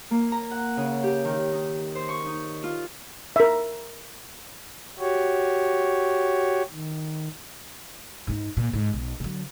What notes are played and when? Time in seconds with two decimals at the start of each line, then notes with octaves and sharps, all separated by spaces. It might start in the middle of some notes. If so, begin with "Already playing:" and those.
0.11 A#3
0.32 A#5
0.51 F#5
0.77 C#3
1.04 G4
1.25 D#3
1.52 D#4
1.95 C5
2.09 C#6
2.26 D#4
2.63 F4
3.36 A#4 E5
4.99 F#4 G4 C#5
6.71 D#3
8.27 G#2 D#4
8.57 A#2
8.73 G#2
8.93 B1
9.20 D3 F#3